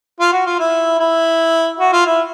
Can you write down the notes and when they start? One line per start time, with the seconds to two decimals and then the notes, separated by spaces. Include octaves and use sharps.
0.20 F4
0.32 F#4
0.46 F4
0.59 E4
0.99 E4
1.79 F#4
1.93 F4
2.06 E4